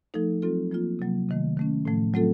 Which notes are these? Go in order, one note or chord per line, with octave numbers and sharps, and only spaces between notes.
F3 A3 D#4 A4
F#3 C4 F4 A4
F3 A#3 F4
C3 F#3 A#3
C3 D#3 A3
D#3 A3 C#4
A2 F3 A3
F#3 A3 C4 F4 A4